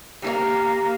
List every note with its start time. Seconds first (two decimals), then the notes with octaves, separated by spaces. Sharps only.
0.22 A#3 G4 G#4 A#4